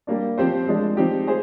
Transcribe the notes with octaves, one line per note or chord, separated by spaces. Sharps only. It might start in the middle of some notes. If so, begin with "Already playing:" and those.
G3 A#3 D4
F3 C4 G4 C5
F3 G#3 D4
F3 C4 D#4 G4
G#4 C5